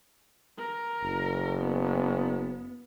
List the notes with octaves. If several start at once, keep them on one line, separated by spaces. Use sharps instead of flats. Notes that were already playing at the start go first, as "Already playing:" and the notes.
A#4
F#1
B3